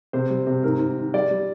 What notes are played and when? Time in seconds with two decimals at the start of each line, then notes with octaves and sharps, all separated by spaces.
0.13 C3 C5
0.30 G3
0.47 C3
0.64 G#2 A#4
0.80 G#2
0.98 D#3
1.14 G3 D5
1.31 G3